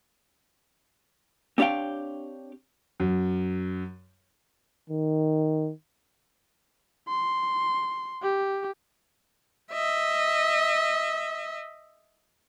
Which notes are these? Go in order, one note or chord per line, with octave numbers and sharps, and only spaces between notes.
C4 D4 G4 C#5 F5 G5
F#2
D#3
C6
G4
D#5 E5